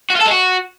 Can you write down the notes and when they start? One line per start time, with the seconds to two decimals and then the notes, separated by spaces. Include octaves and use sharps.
0.10 F#4
0.15 F4
0.20 A4
0.26 G#3
0.31 F#4